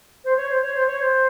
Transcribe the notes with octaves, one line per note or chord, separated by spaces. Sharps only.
C5
C#5
C5
C#5
C5
C#5
C5